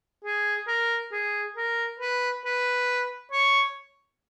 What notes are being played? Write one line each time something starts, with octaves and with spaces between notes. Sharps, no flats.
G#4
A#4
G#4
A#4
B4
B4
C#5